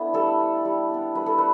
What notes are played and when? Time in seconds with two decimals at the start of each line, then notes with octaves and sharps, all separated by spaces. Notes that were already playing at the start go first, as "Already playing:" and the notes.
Already playing: A3 B3 D4 E4
0.14 G3 A4
0.39 D4
0.65 G3
0.89 B3 D4
1.15 G3 B4
1.26 A4
1.38 B4